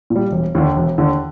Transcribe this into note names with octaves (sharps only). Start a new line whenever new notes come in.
A#2
G3
E1
D#2 D3
E1
D#2 D3